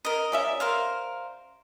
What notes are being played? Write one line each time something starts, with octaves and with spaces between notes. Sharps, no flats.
A#4 D#5
G3 C#4 E5
A#4 C5 F5